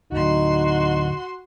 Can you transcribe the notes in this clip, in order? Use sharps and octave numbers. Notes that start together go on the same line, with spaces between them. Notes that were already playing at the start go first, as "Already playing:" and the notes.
D2 A2 D#4 F#4 C6